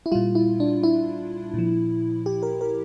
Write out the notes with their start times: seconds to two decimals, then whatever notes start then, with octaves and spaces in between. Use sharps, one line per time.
0.06 E4
0.12 A#2 G3 F4
0.35 E4
0.60 D4
0.83 E4
1.54 A#2 F3
2.26 G4
2.43 A#4
2.61 A#4